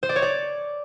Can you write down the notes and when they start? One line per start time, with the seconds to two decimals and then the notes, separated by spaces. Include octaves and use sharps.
0.03 C5
0.09 D5
0.16 C#5
0.22 D5